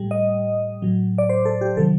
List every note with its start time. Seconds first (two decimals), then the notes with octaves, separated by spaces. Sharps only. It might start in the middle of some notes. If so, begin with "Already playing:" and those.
Already playing: A2 G3
0.11 D#5
0.82 A2 F#3
1.18 D5
1.29 C5
1.45 A4
1.61 G4
1.77 C3 D#3 F#3 A4